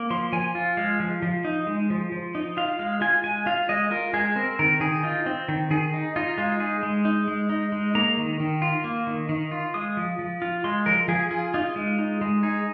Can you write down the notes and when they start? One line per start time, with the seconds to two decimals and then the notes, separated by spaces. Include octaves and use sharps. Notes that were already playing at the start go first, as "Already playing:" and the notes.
Already playing: A#3
0.10 F3 C6
0.33 F3 G#5
0.55 F4
0.77 G#3 F5
1.00 F3
1.22 F3
1.45 D#4
1.67 G#3
1.90 F3
2.12 F3
2.35 D#4
2.57 F4 F5
2.79 G#3 F5
3.01 F4 G#5
3.24 G#3 G#5
3.46 F4 F5
3.69 G#3 D#5
3.91 F4 A#4
4.13 G#3 G#4
4.36 C4 A#4
4.59 D#3 A#4
4.80 D#3 G#4
5.03 D#4 F4
5.26 C4
5.48 D#3
5.71 D#3 G#4
5.94 D#4
6.16 D#4 F4
6.38 G#3 F4
6.60 D#4 G#4
6.83 G#3
7.05 D#4
7.28 G#3
7.50 D#4
7.72 G#3
7.95 A#3 A#5
8.17 D#3
8.40 D#3
8.62 F4
8.84 A#3
9.07 D#3
9.29 D#3
9.51 F4
9.74 G#3 D#6
9.97 F3
10.19 F3
10.42 F4
10.64 G#3 C6
10.86 F3 A#4
11.08 F3 G#4
11.31 F4 G#4
11.54 D#4 F4
11.76 G#3
11.99 D#4
12.21 G#3
12.43 D#4 G#4